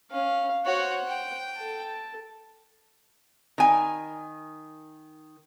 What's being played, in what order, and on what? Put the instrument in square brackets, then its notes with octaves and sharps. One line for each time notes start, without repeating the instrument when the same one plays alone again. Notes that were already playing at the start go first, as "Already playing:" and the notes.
[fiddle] C#4 [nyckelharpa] F5
[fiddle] F#4 C#5 [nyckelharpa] C5 F#5
[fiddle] G5
[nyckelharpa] A4 A5
[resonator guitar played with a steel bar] D#3 G#5